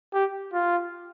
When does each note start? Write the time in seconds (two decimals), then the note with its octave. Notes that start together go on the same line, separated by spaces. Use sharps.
0.13 G4
0.53 F4